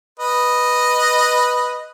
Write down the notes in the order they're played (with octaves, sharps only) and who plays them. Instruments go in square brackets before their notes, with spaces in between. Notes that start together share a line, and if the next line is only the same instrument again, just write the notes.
[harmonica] B4 D#5